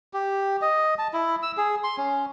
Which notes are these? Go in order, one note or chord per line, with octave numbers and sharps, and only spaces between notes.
G4
D#5
A5
E4
E6
G#4
C6
C#4